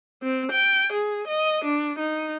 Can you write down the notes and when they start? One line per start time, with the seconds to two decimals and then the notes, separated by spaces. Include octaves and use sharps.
0.23 C4
0.51 G5
0.92 G#4
1.28 D#5
1.64 D4
1.99 D#4